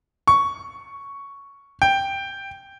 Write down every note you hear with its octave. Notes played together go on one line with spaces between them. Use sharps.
C#6
G5